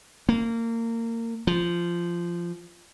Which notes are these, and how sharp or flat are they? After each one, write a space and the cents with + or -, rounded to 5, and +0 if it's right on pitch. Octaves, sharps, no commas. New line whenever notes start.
A#3 -25
F3 -15